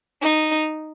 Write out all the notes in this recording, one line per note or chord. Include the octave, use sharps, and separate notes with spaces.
D#4